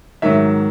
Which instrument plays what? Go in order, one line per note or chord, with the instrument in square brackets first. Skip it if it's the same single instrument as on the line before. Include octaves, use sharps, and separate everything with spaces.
[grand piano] G#2 D#3 F#3 E5